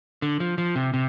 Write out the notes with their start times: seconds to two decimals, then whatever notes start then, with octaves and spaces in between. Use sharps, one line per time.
0.22 D3
0.40 F3
0.58 F3
0.76 C3
0.94 C3